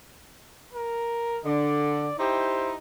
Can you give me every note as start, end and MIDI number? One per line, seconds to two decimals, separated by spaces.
0.73 1.40 70
1.45 2.09 50
1.45 2.15 74
2.19 2.74 63
2.19 2.74 64
2.19 2.74 67
2.19 2.72 72